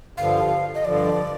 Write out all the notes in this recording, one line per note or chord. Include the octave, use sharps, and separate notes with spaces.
G2 D3 F3 F5
D#5
G2 D3 F3 D5